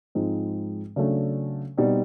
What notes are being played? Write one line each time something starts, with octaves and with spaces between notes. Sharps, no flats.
G#2 F3 G#3 C4 D#4
C#3 F#3 A3 D4
B2 G3 C4 D#4